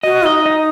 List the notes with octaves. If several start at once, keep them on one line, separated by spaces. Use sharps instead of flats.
F#4 D#5
D#4 D#5
D#5